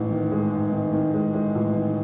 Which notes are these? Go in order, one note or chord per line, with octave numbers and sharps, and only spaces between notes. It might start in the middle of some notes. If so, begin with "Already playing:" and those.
Already playing: A1 G#2
D#3
G#3
G#2
D#3
D#3
G#3
G#3
A1
D#3